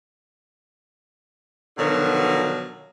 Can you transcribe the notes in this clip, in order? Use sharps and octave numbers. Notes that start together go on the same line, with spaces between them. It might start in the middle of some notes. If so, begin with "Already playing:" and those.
B2 D3 D#3 F3 F#3